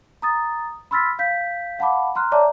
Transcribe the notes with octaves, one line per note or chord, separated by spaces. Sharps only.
A#5 D#6 A6
B5 C6 E6 F6 A6 B6
F5 G6 B6
F5 F#5 A5 B5 D6
A#5 C6 F6 F#6
C#5 D5 E5 A5 A#5 D6